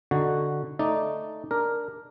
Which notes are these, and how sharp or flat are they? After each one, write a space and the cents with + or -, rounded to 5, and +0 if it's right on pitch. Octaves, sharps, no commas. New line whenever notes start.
D3 +0 D#4 +0 F#4 +0
A3 +0 D#4 +0 D5 +0
D4 +0 A#4 +0